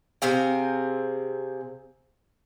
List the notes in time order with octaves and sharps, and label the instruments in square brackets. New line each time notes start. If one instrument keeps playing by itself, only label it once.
[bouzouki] C3 C4 G#4 F5